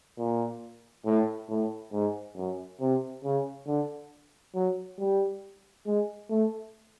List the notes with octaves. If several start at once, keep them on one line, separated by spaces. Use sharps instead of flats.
A#2
A2
A2
G#2
F#2
C3
C#3
D3
F#3
G3
G#3
A3